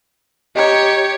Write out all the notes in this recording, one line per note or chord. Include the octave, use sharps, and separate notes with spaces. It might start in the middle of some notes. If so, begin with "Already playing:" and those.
G4 C#5 D#5 A#5